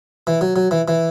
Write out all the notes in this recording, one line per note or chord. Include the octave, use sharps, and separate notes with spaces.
E3
F#3
F#3
E3
E3